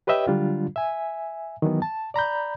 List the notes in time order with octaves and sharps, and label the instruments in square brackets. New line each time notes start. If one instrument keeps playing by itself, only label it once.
[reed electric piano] G4 B4 C#5 D#5 E5 G5
D3 F#3 G3 D4 F4
E5 G#5
D#3 E3 F#3 B3
A5
D5 A#5 B5 G6